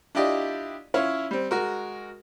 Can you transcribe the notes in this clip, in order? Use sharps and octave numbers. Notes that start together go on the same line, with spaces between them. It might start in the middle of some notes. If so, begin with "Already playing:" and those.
D4 E4 F4 G4 D5 D#5
C#4 E4 F4 C#5 F5
G3 C4
G#3 F#4 A#4